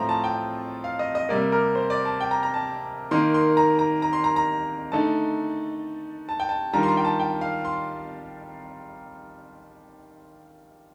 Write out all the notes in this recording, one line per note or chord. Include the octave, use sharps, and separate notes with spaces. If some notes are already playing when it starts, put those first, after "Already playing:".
Already playing: A2 F3 A3 C4 F4 A#5
A5
G5
F5
D#5
D#5
C3 G3 A#3 D5
A#4
C5
D5
A5
G5
A#5
A#5
A5
D#3 A#3 D#4 C6
C6
A#5
A#5
A#5
C6
A#5
A#5
D3 A3 D#4 A5
A5
G5
A5
D#3 G3 D4 F4 A#5
C6
A#5
G5
A5
G5
F5
C6